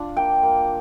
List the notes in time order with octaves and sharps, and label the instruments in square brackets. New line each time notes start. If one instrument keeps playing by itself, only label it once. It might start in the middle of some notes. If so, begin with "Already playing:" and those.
Already playing: [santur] D4 F4
A#3 G5
A#3